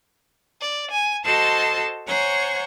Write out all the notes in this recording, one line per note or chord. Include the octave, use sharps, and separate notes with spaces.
D5
G#5
F#4 A4 C5 D#5 A5 C6
C5 C#5 F#5 G#5 A#5 C#6